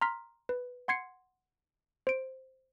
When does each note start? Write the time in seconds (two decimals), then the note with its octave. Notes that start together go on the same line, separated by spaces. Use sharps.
0.01 A#5 C6 F6 B6
0.49 B4
0.88 F#5 C6 G#6 C7 C#7
2.07 C5 D7